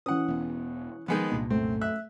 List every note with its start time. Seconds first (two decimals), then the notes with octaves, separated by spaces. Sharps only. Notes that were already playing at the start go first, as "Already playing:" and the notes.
0.06 E3 C#4 F#5 D#6
0.28 E1 B3
1.08 D#3 F3 G#3 B3
1.32 C2 G2 A#2
1.50 F#2 A3 C4
1.81 E5 F#6